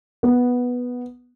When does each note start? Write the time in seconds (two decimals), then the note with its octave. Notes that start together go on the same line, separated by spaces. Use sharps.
0.23 B3